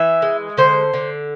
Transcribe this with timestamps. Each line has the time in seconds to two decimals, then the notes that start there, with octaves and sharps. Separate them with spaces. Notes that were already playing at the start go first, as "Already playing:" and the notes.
Already playing: E3 E5
0.22 G#3
0.57 D3 C5
0.93 D3